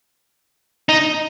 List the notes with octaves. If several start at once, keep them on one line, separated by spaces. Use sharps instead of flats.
D#4